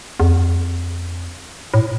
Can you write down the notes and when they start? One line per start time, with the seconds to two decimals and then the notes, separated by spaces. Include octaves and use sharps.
0.20 E2
0.23 F2
1.74 A2